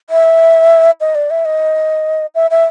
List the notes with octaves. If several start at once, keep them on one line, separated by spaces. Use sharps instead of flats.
E5
D#5
D5
E5
D#5
E5
E5